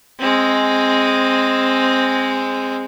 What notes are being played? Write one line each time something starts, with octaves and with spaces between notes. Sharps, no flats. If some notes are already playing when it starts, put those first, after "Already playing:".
G#3 C4